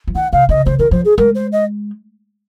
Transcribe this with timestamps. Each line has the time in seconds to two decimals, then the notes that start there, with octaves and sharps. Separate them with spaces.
0.07 F3
0.15 D#3 F#5
0.32 C3 F5
0.49 C#3 D#5
0.66 C#3 C5
0.79 D#3 A#4
0.91 F3 C5
1.05 G#4
1.18 G#3 A#4
1.35 C5
1.52 D#5